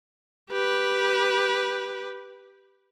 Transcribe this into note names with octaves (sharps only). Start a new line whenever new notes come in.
G4 B4